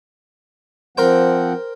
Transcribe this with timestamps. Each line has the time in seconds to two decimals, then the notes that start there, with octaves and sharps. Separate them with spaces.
0.98 F3 C4 A#4 C5 F#5 G5